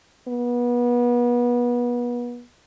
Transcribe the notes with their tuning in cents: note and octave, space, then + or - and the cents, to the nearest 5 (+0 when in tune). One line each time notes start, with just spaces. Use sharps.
B3 -30